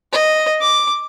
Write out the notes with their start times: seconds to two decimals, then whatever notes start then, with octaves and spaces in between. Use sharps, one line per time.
0.12 D#5
0.61 D6